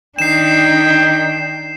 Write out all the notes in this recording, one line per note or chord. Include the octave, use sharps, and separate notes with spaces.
D#3 D4 G5 C7 E7